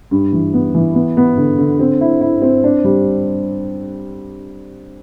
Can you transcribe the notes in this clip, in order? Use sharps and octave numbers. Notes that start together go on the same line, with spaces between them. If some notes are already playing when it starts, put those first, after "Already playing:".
G2
E3
B3
E3
B3
B3
D3
D3
C4
E4
E4
C4
D4
G3